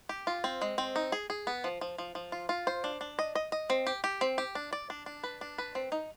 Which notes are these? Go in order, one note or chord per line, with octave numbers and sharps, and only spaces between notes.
G4
F4
C4
G#3
C4
D#4
G#4
G#4
B3
F3
F3
F3
F3
F4
F4
C5
D4
D4
D#5
D#5
D#5
C4
G4
G4
C4
G4
D4
D5
D4
D4
B4
D4
B4
C4
D#4